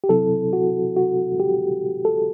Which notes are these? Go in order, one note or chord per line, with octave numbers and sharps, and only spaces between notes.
G4
C3 F#3 C4 E4 A4
F#4
F#4
G4
A4